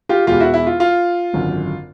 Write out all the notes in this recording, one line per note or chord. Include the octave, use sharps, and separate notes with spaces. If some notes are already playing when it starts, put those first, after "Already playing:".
F4 G4
E2 B2 G#3 B3 F4 G4
E4 F#4
E4
F4
F4
G#1 F#2 D3